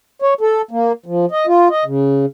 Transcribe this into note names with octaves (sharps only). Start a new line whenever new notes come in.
C#5
A4
A#3
F3
D#5
F4
D#5
C#3